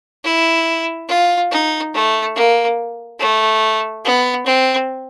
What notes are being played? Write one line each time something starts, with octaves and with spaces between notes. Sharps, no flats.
E4
F4
D#4
A3
A#3
A3
B3
C4